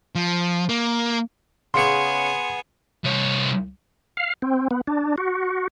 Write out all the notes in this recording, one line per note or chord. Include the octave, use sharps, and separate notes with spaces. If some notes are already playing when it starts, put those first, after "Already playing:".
F3
A#3
C#3 B3 G#4 F#5 C6 C#6 C#7
C2 C#5
F5
C4
B3
D4
F#4